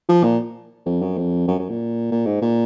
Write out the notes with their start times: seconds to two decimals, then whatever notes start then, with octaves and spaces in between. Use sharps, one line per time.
0.09 F3
0.23 A#2
0.86 F2
1.02 F#2
1.17 F2
1.48 F#2
1.59 F#2
1.69 A#2
2.11 A#2
2.26 G#2
2.41 A#2